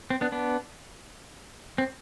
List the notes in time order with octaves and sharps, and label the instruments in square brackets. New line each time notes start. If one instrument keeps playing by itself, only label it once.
[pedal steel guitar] C4
B3 D4
B3 D4
C4